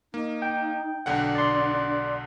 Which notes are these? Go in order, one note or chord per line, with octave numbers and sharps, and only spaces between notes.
A#3 D#4
G5
B1 D3 D4 F#5
D5 C6